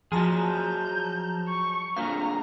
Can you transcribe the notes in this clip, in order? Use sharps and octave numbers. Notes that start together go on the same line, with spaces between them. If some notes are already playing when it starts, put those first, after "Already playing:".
F3 F#3 G#4 A5 A#5
G6
C#6
D2 A#2 D3 F5 A#5